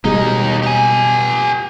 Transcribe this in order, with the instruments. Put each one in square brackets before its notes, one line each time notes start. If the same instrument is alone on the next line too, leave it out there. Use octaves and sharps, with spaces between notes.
[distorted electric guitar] D#2 D#4 [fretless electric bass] B2 G3 G#3
[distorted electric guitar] G4 G#5